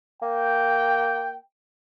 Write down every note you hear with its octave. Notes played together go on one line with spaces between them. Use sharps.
A#3 G5